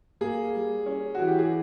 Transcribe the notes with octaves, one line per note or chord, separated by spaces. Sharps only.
A#3 G#4
G3
C#4
E3 F#4
G4
G#4